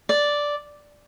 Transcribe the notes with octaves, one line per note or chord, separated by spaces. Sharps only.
D5